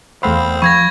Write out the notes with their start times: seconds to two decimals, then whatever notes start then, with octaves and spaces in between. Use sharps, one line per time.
0.23 E2 A3 C4 F5 F#5 B5 C6
0.62 F3 B5 C#6 G#6 A#6